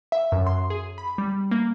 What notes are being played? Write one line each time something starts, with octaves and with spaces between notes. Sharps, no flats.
E5
F#2
C6
G#4
B5
G3
A#3